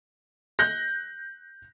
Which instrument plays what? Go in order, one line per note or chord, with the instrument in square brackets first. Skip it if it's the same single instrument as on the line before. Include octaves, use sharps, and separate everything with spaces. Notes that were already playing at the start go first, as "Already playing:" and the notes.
[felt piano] F#6 G6 A#6